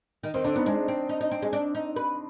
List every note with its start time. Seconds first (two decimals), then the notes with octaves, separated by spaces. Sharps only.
0.23 D#3
0.34 D#3 C4
0.44 D3 D4
0.56 B3 D#4
0.66 G#3 D4
0.88 C4
1.09 D#4
1.21 D#4
1.32 C4
1.42 G#3
1.53 D4
1.75 D#4
1.96 B4